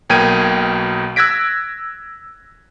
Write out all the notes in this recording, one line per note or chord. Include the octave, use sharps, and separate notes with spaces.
B1 B2 A#3 G5 G#6 D#7
E6 F#6 G#6 A#6 B6 D7